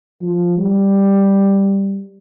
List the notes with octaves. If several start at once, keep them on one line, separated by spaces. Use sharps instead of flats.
F3
G3